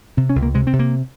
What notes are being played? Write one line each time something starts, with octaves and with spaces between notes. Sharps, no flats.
C3 C4
C#4
C#2
A#3
C3 G#3
C4
C3
A#3